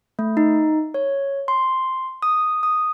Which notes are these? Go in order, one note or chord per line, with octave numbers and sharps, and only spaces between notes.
A3
D#4
C#5
C6
D#6
D#6